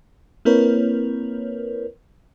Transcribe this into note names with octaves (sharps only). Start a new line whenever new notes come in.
A#3 C4 E4 A#4 B4 C#5